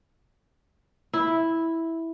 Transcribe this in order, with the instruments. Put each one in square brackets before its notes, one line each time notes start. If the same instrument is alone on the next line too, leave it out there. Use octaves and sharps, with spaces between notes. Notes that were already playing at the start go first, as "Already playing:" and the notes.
[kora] E4